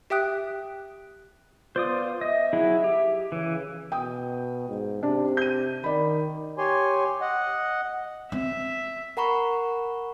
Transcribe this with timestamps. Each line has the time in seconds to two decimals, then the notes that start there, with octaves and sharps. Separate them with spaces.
0.10 G4 E5 G5 D#6 F#6
1.76 B3 F4 C5 D5 D#6
2.21 D#5 E5
2.53 F#3 E4 G#4
2.84 G4
3.32 C#3 E3
3.92 B2 G5 D#6
4.69 G#2
5.03 C3 D4
5.37 G6 D#7
5.84 D#3 D5 B5
6.58 G4 C#5 G#5 C6
7.21 D#5 F#5
8.32 C4 E5
9.17 A#4 F#5 A#5 B5 C#6